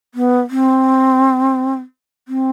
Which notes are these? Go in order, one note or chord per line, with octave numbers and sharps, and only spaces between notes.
B3
C4
C4